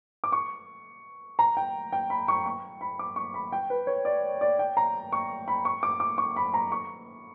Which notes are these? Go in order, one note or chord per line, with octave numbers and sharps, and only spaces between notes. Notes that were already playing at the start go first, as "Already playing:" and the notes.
D6
C#6
A#5
G5
G5
B5
C#6
C#6
B5
D6
C#6
B5
G5
B4
C#5
D5
D5
G5
A#5
C#6
B5
C#6
D6
D6
C#6
B5
A#5
C#6